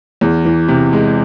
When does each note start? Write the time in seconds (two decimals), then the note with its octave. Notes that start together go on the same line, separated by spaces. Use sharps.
0.21 E2
0.45 E3
0.68 C3
0.93 G#3